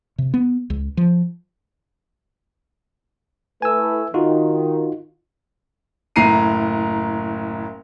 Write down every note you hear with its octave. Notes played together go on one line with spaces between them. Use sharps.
C3
B3
C#2
F3
A3 E4 B4 G#5 E6
D#3 D#4 F4 F#4
F#1 A2 A#5 C7 D#7